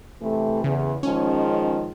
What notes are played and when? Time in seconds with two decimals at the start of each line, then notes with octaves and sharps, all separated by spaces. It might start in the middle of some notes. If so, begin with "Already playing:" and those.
0.22 C3 E3 A3
0.64 E2 C#3
1.03 D#3 F3 G#3 C#4